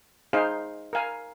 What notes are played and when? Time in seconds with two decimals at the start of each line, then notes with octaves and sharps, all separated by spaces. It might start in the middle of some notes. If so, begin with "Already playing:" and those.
0.33 D#4 G#4 C5 F5
0.93 A#4 F5 G#5